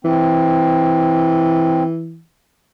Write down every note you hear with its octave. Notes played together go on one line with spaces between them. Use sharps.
E3 C4